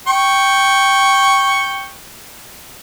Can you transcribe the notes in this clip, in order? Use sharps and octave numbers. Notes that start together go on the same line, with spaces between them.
G5 C#6